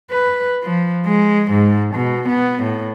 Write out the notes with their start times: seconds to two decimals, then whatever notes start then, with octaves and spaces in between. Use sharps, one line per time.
0.11 B4
0.63 F3
1.05 G#3
1.51 G#2
1.95 B2
2.28 B3
2.63 A2